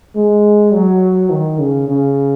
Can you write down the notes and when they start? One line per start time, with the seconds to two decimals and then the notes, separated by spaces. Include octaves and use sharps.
0.15 G#3
0.73 F#3
1.30 D#3
1.60 C#3
1.89 C#3